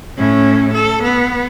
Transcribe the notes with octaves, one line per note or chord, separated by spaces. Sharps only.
A2 C#4
A4
B3